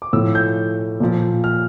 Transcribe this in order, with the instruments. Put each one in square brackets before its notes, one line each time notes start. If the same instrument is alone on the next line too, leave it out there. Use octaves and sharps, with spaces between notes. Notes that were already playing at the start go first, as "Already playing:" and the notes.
[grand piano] D6
A2 F3 E6
G6
A#2 F3
F6